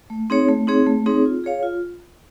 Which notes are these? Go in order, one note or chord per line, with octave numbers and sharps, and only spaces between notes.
A3
C4 D#4 G#4 C#5
A3
C4 D#4 G#4 C#5
A3
C4 D#4 G#4 C#5
F4
G#4 C#5 F5
F4